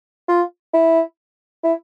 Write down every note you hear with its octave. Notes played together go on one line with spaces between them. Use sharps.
F4
E4
E4